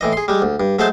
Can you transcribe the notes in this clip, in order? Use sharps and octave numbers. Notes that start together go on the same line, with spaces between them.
A2 E3 D#5
G#4 C6
G3 G#3
D2
G2
F#3 G#3 A3 C5 A5 C6